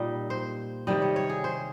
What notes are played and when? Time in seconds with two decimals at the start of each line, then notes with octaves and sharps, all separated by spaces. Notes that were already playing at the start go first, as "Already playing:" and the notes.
Already playing: A#2 G3 D#4
0.30 C5
0.87 C3 D#3 G3 D#5
1.02 C#5
1.16 C#5
1.30 G#4
1.44 C5